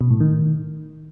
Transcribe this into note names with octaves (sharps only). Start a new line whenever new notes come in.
B2
A2
D#3